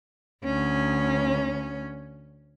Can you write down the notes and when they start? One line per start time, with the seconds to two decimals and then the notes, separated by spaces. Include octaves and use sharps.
0.44 D2 C#4